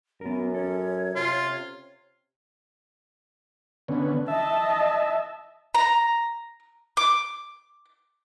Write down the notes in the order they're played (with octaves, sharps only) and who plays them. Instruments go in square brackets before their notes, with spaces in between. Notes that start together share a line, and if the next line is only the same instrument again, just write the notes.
[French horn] F#2 [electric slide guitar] B3 A#4 [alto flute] C#4
[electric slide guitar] C#4 A4 [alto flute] C#5
[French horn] C3 [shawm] F4
[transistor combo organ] D3 B3 C#4
[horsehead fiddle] D#5 A5 [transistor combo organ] E5
[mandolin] A#5
D6